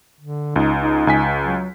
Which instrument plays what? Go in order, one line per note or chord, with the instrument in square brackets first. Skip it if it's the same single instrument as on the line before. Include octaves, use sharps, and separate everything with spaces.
[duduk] D3
[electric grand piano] C#2 [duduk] D#4
[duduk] D#4
[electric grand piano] C#2 G#5 B6
[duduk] F#3